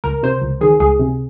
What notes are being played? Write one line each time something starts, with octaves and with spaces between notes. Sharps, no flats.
C#2 A#4
C3 C5
C#2
D#3 G#4
C#2 G#4
C3